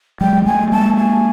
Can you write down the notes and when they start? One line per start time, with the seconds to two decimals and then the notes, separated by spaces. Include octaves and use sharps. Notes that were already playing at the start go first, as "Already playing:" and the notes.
0.21 F#3 G#3 G5
0.46 G3 A3 G#5
0.72 G#3 A#3 A5
0.98 G#5